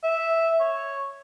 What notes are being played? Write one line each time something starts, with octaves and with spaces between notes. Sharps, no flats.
E5
C#5